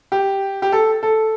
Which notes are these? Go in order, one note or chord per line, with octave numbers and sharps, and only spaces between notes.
G4
G4
A4
A4